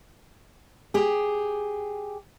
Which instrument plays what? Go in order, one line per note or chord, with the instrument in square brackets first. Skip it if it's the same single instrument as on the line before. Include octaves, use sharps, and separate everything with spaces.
[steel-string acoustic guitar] G4 G#4